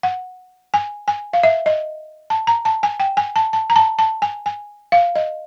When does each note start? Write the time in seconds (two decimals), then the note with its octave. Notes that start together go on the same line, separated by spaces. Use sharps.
0.03 F#5
0.74 G#5
1.08 G#5
1.33 F5
1.43 E5
1.66 D#5
2.30 A5
2.47 A#5
2.65 A5
2.83 G#5
3.00 G5
3.17 G#5
3.36 A5
3.53 A5
3.70 A#5
3.76 A5
3.99 A5
4.22 G#5
4.46 G#5
4.92 F5
5.16 D#5